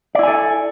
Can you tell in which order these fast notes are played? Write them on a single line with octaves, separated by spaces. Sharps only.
D5 E4 G#5 A4